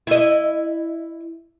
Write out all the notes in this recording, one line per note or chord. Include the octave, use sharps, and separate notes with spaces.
E4 D#5